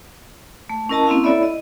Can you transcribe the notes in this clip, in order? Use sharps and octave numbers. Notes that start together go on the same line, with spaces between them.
A3
C#4 E4 A#4 D#5 A5 A#5
A#3 C4 C#4 E4 F5
E4 A4 C#5 D5 E5 B5
D#5